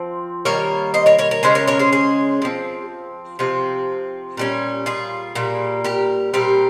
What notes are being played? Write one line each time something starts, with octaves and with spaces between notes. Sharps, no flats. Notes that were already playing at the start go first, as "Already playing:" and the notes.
Already playing: F3 C4
D#3 G3 A#3 A#4 C#5
C5 D#5
A#4 C#5
A#4 C#5
A#4 C#5
C#3 G#3 C#4 G#4 C5
A#4 C#5
A#4 C#5
G#4 C5
G#4 C5
F3 C4
C3 F3 C4
A#2 G3 C#4
F4 G#4
A#2 G3 A#3
G4 A#4
A#2 G3 C4 G4 A#4